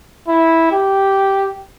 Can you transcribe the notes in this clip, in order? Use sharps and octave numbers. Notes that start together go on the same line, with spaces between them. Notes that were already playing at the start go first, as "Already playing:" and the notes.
E4
G4